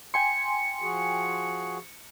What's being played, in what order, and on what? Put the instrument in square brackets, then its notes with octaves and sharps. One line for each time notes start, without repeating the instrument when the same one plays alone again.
[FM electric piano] G5 G#5 C6 [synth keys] C#7
[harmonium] F3 F#4 G#4